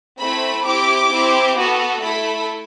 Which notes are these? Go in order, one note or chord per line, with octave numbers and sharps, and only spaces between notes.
A3 C4 E4 B5
C4 E4 G4 D6
C4 E4 G4
B3 F#4 A4
A3 E4 A4 B5